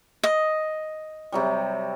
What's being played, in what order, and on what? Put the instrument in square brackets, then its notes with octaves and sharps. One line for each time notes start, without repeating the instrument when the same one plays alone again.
[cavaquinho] D#5
[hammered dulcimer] C3 F#3 G3